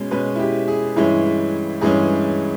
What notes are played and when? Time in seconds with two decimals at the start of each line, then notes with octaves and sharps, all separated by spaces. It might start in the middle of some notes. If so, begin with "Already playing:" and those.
Already playing: B2 G#3 C#4
0.11 B2 G#3 C#4 B4
0.36 E4
0.39 G4
0.68 G#4
0.96 G2 E3 G#3 C#4 E4
1.81 G2 E3 G#3 C#4 G#4